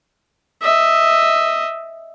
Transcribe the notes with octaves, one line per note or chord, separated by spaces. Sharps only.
D#5 E5